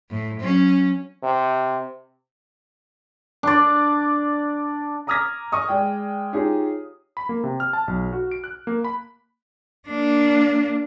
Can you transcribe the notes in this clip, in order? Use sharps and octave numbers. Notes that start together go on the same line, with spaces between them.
A2
F#3 C#4
C3
D4 D5
A#5 D6 D#6 F6 G#6 A#6
D#5 C#6 D#6
G#3 D5 G5
D#4 F4 G4 G#4 C#5
B5
A#3
C3
F6
A5
B1
F#4
D7
F#6
A#3
B5
A#3 D4